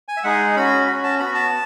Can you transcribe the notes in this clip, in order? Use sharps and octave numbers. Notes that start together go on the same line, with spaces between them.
G#5
E5
G#3 D#4 G#4 F#5
C#4 F#4 B5
C#4 F#4 B5
A5
B3 F#4 B5
A5